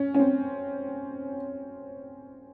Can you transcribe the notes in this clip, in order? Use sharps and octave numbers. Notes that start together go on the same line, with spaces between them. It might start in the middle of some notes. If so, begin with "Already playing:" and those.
Already playing: C#4
C#4
C4